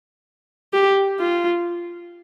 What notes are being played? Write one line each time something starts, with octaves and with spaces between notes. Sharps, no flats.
G4
F4